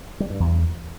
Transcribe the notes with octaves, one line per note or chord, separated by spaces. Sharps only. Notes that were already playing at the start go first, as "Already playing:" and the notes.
G3
G2
E2